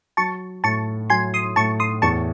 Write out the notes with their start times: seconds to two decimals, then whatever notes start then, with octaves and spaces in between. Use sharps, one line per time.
0.17 F#3 A5 C#6
0.64 A2 A5 C#6
1.10 F#3 G#5 C6
1.34 C6 D#6
1.56 A2 A5 C#6
1.80 C6 D#6
2.02 E2 A5 C#6